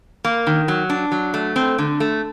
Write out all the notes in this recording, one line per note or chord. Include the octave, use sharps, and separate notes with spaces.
A#3
D#3
F#3
D4
F#3
A3
C4
D3
A3